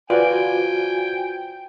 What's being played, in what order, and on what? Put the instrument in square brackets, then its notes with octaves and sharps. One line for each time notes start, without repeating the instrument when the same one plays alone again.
[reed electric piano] F4 F#4 C5 [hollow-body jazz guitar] B4 D5 [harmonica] G5 G#5